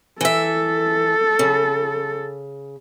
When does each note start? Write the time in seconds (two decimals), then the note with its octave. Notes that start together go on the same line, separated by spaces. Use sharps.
0.21 E3 A4 E5
1.39 C#3